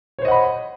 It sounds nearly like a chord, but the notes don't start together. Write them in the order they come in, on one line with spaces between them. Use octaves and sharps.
C#5 C5 D#5 F#5 B5